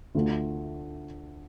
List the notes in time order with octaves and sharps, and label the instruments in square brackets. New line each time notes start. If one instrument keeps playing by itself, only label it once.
[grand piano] D2 D3 A3 F4